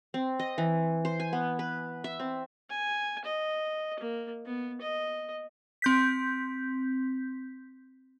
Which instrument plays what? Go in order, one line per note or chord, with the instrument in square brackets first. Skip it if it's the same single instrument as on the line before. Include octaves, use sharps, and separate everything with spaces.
[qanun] C4
D#5
E3
C5
G#5
B3
B4
E5
C4
[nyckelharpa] G#5
D#5
A#3
B3
D#5
[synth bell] C4 G6 B6